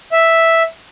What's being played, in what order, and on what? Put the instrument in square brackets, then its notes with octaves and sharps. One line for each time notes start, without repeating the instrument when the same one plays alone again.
[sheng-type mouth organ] E5